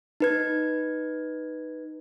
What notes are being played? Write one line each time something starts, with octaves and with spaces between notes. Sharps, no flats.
D#4 B4 G#6